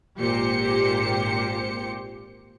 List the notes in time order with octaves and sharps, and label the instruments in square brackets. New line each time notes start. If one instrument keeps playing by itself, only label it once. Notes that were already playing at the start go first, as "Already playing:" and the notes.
[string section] G#1 A#2 G4 C5 C#7